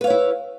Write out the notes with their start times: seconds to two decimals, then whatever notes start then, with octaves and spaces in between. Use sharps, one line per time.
0.01 B4
0.04 F5
0.07 C#5
0.10 E4